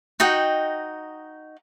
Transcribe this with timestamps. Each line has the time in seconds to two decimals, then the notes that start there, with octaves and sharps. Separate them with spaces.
0.20 D#4 F#4 D#5 G5